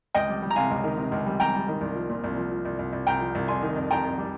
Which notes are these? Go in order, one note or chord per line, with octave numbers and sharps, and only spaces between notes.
C#2 D#5 G5
G3
G3
A#5
C3 F5 G#5
C#2
D#3
C3
C#2
G3
G3 G5 A#5
G3
D#3
C2
F3
A#2
C2
F3
F3
C2
C2
C2
C2 G5 A#5
F3
C2
F2 G#5 C6
D#3
F2
F2 G5 A#5
F2
G3